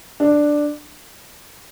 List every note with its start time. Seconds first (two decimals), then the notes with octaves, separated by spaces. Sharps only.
0.20 D4